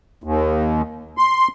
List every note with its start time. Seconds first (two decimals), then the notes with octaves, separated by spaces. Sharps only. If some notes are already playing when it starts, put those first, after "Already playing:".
0.24 D#2
1.18 C6